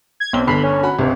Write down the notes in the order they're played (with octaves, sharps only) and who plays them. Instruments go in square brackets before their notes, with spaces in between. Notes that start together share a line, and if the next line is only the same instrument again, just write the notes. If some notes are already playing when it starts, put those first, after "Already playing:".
[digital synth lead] G#6
[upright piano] B1 G7 [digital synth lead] C4
[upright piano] G1 D3 C7 [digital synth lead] B5
[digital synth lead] C#4
[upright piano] F#4 B5
[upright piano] G#1 C#2 [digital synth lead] C3